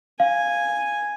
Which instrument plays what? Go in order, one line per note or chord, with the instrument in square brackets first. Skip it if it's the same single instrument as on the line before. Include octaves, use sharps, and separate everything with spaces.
[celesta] F5 [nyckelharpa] G#5